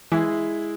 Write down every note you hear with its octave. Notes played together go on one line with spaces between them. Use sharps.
E3 G#3 E4 G#4